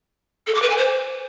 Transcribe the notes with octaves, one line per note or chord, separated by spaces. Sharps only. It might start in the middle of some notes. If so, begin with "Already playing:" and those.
A4
D6
B4
G#5
C5